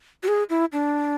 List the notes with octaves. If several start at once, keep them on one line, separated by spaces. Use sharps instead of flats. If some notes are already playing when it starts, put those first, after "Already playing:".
F#4
G#4
E4
D4